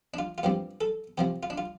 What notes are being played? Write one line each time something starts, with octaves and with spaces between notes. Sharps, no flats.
D4
F4
F4
G2 F3 C4 G4
A4
C3 F3 C4 G4
F4
D4
F4